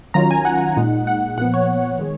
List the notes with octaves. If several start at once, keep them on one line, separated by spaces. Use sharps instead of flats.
D#3 F#3 C#4 F4 A#5
G#5
F#5
A#2 G#3 D#4
F#5
A#2 F3 B3 F#5
C#5
D#3 G#3